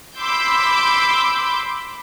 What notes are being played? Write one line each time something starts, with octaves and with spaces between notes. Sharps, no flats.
B5 C6 D6 E6 G6